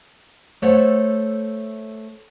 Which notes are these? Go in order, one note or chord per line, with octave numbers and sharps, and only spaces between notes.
A3 A4 C5 C#5 F#5